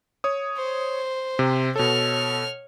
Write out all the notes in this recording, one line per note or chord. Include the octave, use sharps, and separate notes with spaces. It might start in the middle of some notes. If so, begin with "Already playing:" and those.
C#5 D#6
C5
C3
B2 A4 C#5 F6